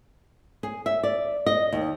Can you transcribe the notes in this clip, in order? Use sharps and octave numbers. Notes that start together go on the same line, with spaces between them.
G#4
E5
D5
D#5
D#2